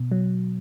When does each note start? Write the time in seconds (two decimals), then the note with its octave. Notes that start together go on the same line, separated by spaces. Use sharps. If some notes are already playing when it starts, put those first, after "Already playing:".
Already playing: B2
0.12 F#3